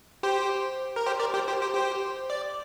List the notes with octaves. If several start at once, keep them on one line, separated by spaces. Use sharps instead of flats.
G4 C5
A#4
G4 C5
A#4 D5
G4 C5
G4 C5
G4 C5
G4 C5
D5